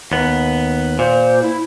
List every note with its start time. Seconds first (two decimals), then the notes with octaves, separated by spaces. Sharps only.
0.12 D#2 B3
0.99 A#2 C5
1.42 E4